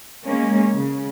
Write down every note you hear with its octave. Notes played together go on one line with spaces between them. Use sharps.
G#3 A#3 C#4
C#3